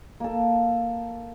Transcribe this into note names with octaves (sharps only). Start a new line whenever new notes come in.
A#3 A4